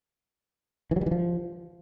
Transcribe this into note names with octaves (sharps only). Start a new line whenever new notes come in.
E3
F#3
G3
E3
F3